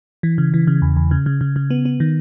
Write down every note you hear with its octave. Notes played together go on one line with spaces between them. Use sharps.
E3
C#3
E3
C#3
E2
E2
C#3
C#3
C#3
C#3
B3
B3
D#3